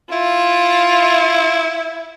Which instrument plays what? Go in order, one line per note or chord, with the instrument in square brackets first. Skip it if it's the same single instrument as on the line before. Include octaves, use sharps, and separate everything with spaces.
[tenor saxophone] E4 [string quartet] F4